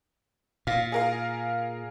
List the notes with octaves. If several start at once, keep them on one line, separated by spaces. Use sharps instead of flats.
A#2 F5
G#4 A#4 F5